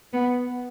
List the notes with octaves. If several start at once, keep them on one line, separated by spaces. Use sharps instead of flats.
B3